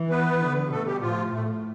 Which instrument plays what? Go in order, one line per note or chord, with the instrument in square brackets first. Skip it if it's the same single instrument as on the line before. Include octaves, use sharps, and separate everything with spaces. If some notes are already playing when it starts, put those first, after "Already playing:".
Already playing: [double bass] E3
[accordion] B3 B4
[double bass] D3
[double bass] B2 [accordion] A3 A4
[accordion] G3 G4
[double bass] A2 [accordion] F3 F4
[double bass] A2 [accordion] A3